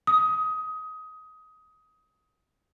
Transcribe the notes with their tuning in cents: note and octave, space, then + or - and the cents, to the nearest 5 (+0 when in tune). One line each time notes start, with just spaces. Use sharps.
D#6 +20